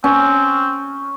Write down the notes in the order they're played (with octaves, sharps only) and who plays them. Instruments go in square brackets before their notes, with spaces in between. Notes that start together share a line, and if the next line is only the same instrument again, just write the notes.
[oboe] C4 [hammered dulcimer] C#4